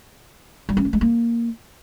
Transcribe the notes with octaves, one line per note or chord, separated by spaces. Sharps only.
G3
C#4
A3
G#3
A#3